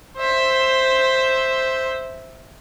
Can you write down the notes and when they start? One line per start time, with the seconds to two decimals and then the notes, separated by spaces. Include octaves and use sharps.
0.18 C5 E5